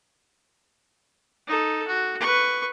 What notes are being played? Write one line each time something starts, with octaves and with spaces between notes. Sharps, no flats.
D#4 A4
F#4
B4 C#6